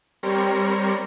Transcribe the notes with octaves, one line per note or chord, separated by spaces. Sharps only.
G3 C4 A#4 C#5